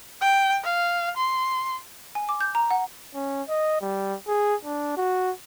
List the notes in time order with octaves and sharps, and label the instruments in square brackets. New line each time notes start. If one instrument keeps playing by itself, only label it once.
[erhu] G5
F5
C6
[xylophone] G#5
D6
G6
A#5
F#5
[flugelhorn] C#4
D#5
G3
G#4
D4
F#4